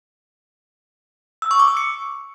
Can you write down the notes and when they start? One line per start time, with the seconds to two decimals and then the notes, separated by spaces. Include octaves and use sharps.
1.42 E6
1.51 C#6
1.59 D6
1.68 E6
1.77 C#7